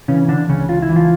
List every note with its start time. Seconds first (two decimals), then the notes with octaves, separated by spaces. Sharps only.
0.08 C#3 E3 C#4
0.28 D3 D4
0.49 C#2 C#3 C#4
0.69 F4
0.82 E4
0.89 E3
0.96 F3 F4